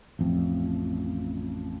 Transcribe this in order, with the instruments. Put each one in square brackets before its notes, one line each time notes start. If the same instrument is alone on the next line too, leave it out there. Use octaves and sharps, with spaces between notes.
[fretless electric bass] A1 F2